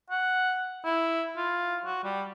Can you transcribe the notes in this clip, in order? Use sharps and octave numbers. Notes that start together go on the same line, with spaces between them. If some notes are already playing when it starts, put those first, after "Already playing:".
F#5
E4
F4
F#4
G3